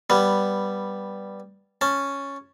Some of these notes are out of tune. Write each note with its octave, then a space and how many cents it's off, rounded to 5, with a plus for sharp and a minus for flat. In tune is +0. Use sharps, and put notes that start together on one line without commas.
G3 +0 B3 -5
C#4 +0 A5 +0